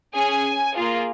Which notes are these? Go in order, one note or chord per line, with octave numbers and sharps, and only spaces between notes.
C#4 G#4 G#5
A#3 F4 G#4